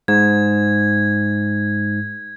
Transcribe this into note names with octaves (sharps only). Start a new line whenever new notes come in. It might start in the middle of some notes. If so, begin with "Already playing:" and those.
G#2 G#6